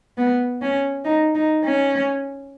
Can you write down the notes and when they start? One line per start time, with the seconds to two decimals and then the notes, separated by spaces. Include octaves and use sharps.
0.17 B3
0.62 C#4
1.05 D#4
1.35 D#4
1.64 C#4